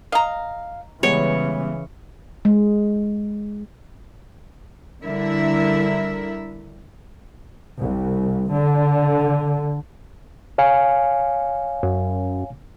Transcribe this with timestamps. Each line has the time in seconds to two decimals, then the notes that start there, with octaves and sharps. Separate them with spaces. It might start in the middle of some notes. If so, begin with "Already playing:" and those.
0.12 D#5 F5 A#5
1.03 C#3 E3 G3 G#3 B3 C#5
2.45 G#3
5.03 D3 G3 E4 A#4 E5
7.79 C2
8.51 D3
10.58 C#5 F5 G#5
11.83 F#2